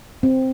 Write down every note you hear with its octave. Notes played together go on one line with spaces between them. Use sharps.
C4